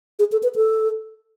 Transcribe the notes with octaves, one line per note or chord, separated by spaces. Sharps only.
G#4
A4
B4
A4